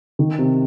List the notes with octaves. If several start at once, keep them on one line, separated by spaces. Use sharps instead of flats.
D#3
C3